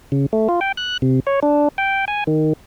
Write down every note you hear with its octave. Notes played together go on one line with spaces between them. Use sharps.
C#3
A3
F4
G5
F#6
C3
C#5
D4
G5
G#5
D#3